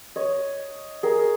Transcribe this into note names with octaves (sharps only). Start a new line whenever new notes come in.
C#5 D#5
G#4 A#4